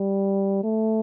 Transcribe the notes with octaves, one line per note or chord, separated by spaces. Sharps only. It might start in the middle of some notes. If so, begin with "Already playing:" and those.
Already playing: G3
A3